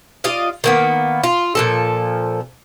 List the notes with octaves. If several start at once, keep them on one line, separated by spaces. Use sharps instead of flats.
F4 D5 D#5 F5
D#3 A#3 B3
F4
A#2 F3 A4